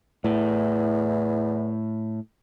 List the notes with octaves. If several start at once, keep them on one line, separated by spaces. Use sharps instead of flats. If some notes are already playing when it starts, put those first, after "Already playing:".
E2 A2